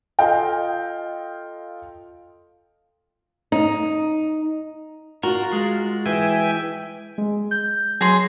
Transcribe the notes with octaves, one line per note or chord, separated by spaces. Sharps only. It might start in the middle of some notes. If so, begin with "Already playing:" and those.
F4 A4 D#5 F5 G5
D#4
F4 F#4 A#4
G#3
E3 E5 G5 G#5
G#3
G6
F#3 G#4 C6 A#6